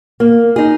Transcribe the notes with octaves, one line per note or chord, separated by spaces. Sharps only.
A#3
D#4 G#4